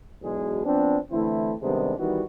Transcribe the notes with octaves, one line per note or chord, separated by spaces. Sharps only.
B1 E2 B2 G#3 G#4
F3 B3 C4 D4
D3 E3 A3 C4 E4
C3 D#3 G3 G#3 B3 D4
D#3 E3 G3 B3 D#4 F#4